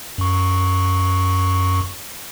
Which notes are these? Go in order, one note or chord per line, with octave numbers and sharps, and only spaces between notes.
F#2 C#6